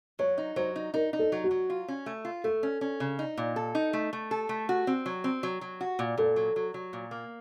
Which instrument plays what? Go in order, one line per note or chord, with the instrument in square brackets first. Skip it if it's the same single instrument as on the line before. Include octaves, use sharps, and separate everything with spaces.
[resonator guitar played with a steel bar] F#3 [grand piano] C#5
[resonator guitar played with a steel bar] D#4
[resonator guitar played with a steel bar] F#3 [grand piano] C5
[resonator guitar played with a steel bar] D#4
[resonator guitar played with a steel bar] D#4 [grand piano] A#4
[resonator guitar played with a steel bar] D#4
[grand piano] A4
[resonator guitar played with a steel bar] F#3
[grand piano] F#4
[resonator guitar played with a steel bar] F#3
F4
C#4
A3
F4
[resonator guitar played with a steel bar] A3 [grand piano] A4
[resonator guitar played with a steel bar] C#4
C#4
C#3
D#4
A#2
A4
D#4
A3
A3
A4
A3
F#4
C4
F#3
C4
F#3
F#3
F#4
A#2
[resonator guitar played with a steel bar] A#2 [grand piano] A4
[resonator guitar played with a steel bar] F#3
F#3
F#3
A#2
A#3